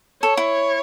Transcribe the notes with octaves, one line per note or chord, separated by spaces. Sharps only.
A4 C#5
E4